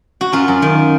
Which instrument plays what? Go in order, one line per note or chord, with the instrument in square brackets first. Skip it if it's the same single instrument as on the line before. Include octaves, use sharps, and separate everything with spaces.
[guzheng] F#4
F#2 F4
F#2
D#3